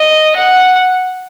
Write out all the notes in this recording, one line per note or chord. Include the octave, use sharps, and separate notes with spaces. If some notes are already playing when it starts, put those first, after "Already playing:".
Already playing: D#5
F#5